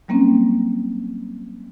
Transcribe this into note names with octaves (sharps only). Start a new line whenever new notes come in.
F#3 G3 A#3 C4 C#4